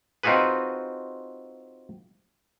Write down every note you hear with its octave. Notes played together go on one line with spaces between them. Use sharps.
C4 D#4 F4 F#4 G#4 B4